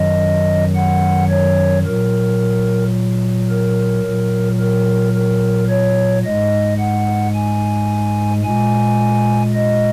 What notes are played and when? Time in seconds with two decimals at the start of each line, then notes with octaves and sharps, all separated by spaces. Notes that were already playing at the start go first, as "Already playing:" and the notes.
Already playing: F#2 D#3 F#3 D#5
0.75 F#5
1.30 C#5
1.85 A#2 F#3 A#4
3.49 A#4
4.04 A#2 F#3
4.59 A#4
5.14 A#4
5.70 C#5
6.24 G#2 G#3 D#5
6.79 F#5
7.34 G#5
8.44 A#2 G#3 G#5
9.53 D#5